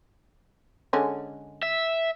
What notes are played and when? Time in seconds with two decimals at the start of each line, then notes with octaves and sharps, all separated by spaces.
0.93 D3 G#3 C#4
1.63 E5